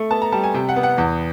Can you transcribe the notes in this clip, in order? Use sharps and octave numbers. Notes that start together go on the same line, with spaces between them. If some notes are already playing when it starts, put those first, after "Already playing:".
Already playing: A3
B3 A5
A#5
G3 A5
G#5
C3 G5
F#5
B3
F#5
E2